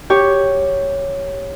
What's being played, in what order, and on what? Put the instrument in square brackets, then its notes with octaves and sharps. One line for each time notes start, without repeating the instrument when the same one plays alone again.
[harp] G4 C#5